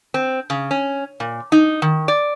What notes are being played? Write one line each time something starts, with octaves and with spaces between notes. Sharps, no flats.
C4
C#3
C#4
A#2
D#4
D#3
D5